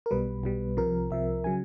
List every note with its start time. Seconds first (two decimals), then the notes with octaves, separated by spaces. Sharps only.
0.06 A#4
0.11 B1 B2 G3 B4
0.44 B1 B2 G3
0.77 C2 C3 F3 A#4
1.11 C2 C3 F3 E5
1.44 C#3 F#3 G#5